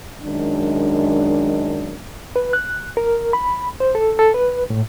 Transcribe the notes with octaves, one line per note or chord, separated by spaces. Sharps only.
F#2 D#3 G#3 D4
B4
F#6
A#4
B5
C5
A4
A4
B4
A2